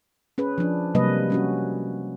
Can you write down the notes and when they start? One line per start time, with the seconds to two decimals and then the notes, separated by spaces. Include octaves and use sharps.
0.38 C#4 G#4 B4
0.58 F3 D4
0.95 C3 F#3 G3 A#3 B4 D#5
1.30 G3 C#4 F#4